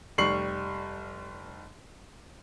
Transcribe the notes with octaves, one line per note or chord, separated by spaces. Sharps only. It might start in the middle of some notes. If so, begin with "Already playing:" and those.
F1 G3 C#6 C7 F#7